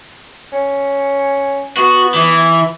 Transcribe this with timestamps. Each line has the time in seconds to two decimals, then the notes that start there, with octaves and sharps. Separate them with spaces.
0.53 C#4
1.77 B3 F#4
2.14 E3